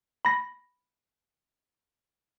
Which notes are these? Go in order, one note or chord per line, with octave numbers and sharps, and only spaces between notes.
B5 A#6